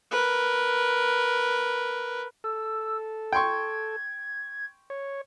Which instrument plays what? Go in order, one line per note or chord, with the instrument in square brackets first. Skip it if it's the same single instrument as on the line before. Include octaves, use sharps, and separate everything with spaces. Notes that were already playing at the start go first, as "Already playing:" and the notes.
[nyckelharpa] A#4 B4
[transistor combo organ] A4 [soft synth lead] E6
[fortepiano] G5 C6 C#6 [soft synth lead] G#6
[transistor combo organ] C#5